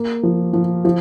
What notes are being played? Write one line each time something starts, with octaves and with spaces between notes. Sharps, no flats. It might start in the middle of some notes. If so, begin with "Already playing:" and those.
Already playing: A#3
F3
F3
F3